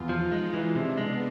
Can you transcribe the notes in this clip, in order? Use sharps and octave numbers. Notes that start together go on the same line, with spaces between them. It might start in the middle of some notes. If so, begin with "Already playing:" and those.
Already playing: E2 F4
F3 D#4
G#3
E3 D4
C3
G#3 B3